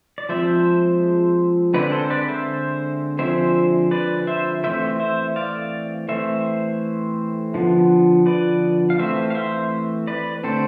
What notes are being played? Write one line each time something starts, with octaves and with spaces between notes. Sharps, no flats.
D5
F3 G#3 C4 C5 E5
D3 G#3 C4 B4 D5
A4 C5
B4 D5
C5 E5
D3 F3 G#3 C4 C5 E5
B4 D5
C5 E5
E3 A3 C4 C5 E5
C5 E5
D5 F5
E3 A3 C4 C5 E5
D3 F3 B3
B4 D5
F5
E3 A3 C4 C5 E5
F5
C5 E5
B4 D5
D3 A3 C4 A4 C5